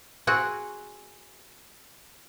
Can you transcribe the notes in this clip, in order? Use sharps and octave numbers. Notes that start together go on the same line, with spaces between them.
C4 F#4 G#4 F#5